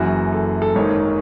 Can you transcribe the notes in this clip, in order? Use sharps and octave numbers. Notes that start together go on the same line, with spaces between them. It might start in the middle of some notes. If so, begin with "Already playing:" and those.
Already playing: F#1 F#2 E3 F#4
A4
A4
G#1 G#2 D#3 C#5